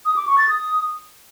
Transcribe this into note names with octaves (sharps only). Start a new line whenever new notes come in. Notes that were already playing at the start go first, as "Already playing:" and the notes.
D#6
D6
C#6
A6
D#6